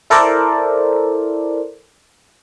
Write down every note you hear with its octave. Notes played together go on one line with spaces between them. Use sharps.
E4 A4 A#4 C5 D5